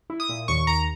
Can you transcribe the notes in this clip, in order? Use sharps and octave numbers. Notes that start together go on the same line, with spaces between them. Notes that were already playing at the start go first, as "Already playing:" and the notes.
E4
D#6
A#2
D#2 C#6
D#2 A#5